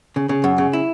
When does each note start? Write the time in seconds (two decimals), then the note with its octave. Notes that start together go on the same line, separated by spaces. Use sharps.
0.16 C#3
0.29 C#3
0.44 F#2
0.58 C#3
0.73 E4